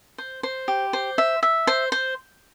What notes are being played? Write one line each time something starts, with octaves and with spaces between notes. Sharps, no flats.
C5
C5
G4
C5
E5
E5
C5
C5